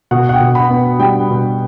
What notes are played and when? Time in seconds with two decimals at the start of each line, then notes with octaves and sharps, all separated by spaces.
0.11 B2 F#5
0.29 F#5
0.33 G5
0.40 B2
0.55 B5
0.70 B3
0.99 G3 G5
1.30 B2